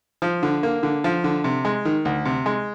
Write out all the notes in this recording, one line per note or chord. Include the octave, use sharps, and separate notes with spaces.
F3
D3
A#3
D3
F3
D3
C3
G#3
D#3
D2
C3
G#3